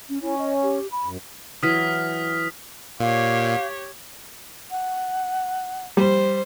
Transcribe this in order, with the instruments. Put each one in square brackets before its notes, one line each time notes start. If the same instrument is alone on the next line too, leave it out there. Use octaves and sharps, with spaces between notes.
[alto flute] C#4
[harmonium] C#4 [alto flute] E4
[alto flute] D#5
G4
B5
[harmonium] F#2
[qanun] E3 F#3 [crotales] D#6 F6 B6
[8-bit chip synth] A#2 [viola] G4 C#5 [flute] F5
[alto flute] F#5
[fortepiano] G3 [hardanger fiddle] C5